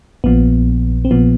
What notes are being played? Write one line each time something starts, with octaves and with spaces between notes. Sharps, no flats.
A#1 A#2 F3 B3
C4
A#1 A#2 F3 B3